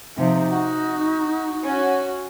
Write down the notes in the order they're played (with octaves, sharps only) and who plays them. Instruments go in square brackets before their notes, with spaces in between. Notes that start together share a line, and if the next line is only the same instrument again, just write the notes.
[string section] C3 F3 [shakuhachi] D#4
[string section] F#4
C#4 F#4